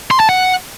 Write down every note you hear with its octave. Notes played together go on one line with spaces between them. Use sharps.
C6
A5
F#5